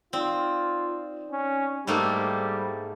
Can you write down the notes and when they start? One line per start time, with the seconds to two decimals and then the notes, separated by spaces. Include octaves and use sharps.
0.13 C4 D#4 F4 D5
1.32 C#4
1.87 G#2 G3 A3 A#3 C5